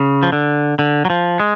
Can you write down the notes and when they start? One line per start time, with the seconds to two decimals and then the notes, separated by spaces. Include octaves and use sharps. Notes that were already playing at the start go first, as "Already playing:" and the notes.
Already playing: C#3
0.23 F3
0.32 D3
0.79 D3
1.05 F#3
1.10 F3
1.40 G#3